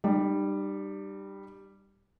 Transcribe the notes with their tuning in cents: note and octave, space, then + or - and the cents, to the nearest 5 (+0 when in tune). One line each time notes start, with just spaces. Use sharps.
G3 +0 D#4 -45